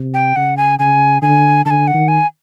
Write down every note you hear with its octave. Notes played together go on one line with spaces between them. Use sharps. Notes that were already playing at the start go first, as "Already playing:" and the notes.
Already playing: C3
G5
C#3 F#5
G#5
C#3 G#5
D3 G#5
D3 G#5 A5
F#5
D#3
G#5